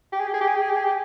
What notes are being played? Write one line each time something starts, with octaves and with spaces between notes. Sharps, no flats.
G4
G#4
G4
G#4
G4
G#4
G4
G#4
G4
G#4
G4